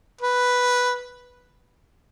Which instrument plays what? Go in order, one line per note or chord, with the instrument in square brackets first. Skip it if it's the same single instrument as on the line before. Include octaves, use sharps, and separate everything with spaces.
[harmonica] B4